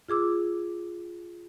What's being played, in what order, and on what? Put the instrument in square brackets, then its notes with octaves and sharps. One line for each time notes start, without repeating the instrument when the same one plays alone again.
[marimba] F4 G#4 D6 E6